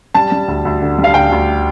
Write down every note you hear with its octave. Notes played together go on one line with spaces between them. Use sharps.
G3 A5
G3
D2
D2
D3
G3
F5
D2 G5
D2